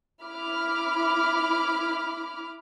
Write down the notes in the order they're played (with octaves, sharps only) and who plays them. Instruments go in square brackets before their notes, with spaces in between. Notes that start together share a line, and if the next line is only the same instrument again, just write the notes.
[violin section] E4 B5 D6 F6